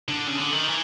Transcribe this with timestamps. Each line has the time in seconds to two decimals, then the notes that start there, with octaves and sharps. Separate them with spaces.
0.08 D3
0.27 C#3
0.37 D3
0.52 D#3
0.68 E3